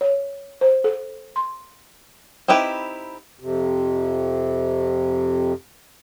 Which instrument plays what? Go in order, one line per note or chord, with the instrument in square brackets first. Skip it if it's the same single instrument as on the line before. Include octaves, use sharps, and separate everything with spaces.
[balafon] C#5
C5
A4
C6
[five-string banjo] C4 D#4 E4 G4 B4
[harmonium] F2 C3